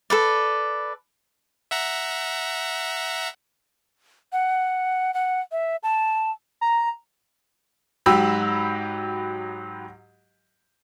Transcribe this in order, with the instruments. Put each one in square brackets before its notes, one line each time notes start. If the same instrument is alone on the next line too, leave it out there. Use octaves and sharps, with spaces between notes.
[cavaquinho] A4 B4 D5
[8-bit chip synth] E5 F#5 A#5
[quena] F#5
F#5
E5
A5
[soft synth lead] A#5
[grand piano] G#2 F#3 G4 B5 E6